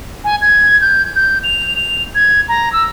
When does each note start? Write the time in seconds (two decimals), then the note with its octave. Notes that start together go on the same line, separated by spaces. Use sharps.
0.24 G#5
0.41 G#6
0.81 G6
1.16 G6
1.44 F7
1.76 F7
2.15 G#6
2.49 A#5
2.73 E6